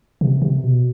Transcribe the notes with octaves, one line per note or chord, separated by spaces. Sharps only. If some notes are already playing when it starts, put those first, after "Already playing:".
C3
C3
B2